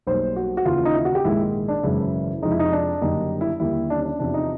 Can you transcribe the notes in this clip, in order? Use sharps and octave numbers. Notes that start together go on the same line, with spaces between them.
B1 B2 G3 A#3 C5
F#4
F#4
D#2 C#3 E3 F4
D#4
E4
F#4
G4
A#1 G#2 D#3 G#3 E4
D4
G#1 F#2 C#3 E3 E4
F2 C3 F3 G#3 D#4
E4
D#4
D4
F#1 F#2 D3 G3 A#3 D#4
E4
D#2 D3 G3 A#3 E4
D4
C#4
D4
E2 C3 F3 D4
D#4